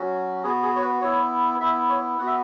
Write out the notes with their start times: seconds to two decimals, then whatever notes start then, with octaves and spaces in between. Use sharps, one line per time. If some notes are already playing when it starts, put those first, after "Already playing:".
Already playing: F#3 C#4 F#4
0.43 B3 F#4 G#4
0.63 G#4
0.76 C#5
0.82 B4
1.02 B3 E4 C#5
1.60 B3 E4 E5
1.89 C#5
2.18 B3 F#4 F#5
2.26 E5